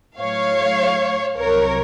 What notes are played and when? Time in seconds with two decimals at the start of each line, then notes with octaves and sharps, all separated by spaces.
0.18 A2 F#3 A3 C#5 F5
1.36 C2 C3 F#3 A#4 C#5